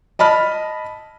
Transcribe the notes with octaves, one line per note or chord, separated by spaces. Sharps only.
D#5 A5 B5 F6